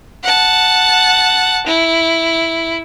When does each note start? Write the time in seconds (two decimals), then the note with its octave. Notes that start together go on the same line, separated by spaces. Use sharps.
0.24 F#5 A5
1.67 E4